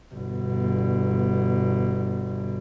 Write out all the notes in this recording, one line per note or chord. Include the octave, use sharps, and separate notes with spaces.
G1 B2